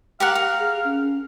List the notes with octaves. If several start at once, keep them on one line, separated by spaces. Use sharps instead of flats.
G4 A#4 F5 F#5
A#4
G#4
C#4